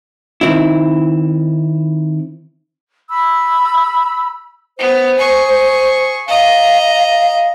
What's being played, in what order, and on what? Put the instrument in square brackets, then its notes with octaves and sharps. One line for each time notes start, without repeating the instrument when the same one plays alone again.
[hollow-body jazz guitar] D#3 C4 E4
[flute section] B5 E6
[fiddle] B3 [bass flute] C5
[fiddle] G#4 C#6
[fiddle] D#5 A#5 [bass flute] F5